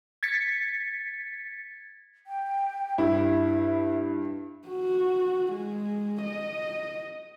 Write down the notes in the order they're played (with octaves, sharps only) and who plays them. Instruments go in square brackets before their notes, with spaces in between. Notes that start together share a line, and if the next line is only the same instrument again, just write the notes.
[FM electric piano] G#6 A6 B6 C#7
[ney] G5
[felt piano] G2 [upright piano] E4 [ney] E5
[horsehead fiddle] F#4
G#3
D#5